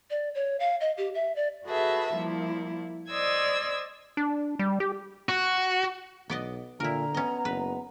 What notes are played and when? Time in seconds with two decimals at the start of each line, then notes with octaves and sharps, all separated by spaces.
0.10 D5
0.35 C#5
0.60 F5
0.81 D#5
0.98 G4
1.15 E5
1.36 D5
1.65 F#4 G#4 A4 B4 E5 A5
2.14 F3 G3 A#3 E4
3.10 C5 D5 D#5 D#6 E6 G#6
4.17 D4
4.59 G3
4.80 G4
5.29 F#4
6.30 B1 B3 D5 D#5
6.80 A#2 D3 E4 A#4 A#5
7.14 B3 C#4 D#5
7.45 F#1 B4